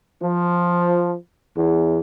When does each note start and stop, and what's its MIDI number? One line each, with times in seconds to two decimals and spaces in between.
0.22 1.14 53
1.56 1.99 40